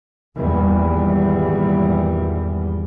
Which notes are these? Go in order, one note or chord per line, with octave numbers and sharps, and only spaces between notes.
G#1 E2 A#2 G3